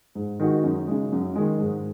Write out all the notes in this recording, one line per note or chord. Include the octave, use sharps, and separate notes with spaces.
G#2
D#3 G#3 D#4 F#4
F#2
C#3 G#3
F#2
D#3 G#3
G#2